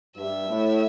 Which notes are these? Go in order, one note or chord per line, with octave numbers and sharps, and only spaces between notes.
G2 E5
A2